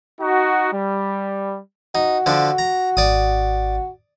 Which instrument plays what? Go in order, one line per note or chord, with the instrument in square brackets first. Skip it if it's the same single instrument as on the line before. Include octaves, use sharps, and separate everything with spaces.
[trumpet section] D#4 F#4
G3
[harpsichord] D#4 [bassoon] F#4
[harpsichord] D3 F3 D4
A#5
[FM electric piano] G#1 [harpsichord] D5 D#6